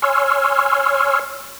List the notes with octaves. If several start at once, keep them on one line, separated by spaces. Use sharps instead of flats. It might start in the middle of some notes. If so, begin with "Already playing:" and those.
C#5 G#5 C6 C#6 E6 F6